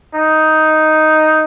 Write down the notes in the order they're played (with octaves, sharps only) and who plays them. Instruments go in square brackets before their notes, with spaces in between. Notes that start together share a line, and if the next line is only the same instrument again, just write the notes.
[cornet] D#4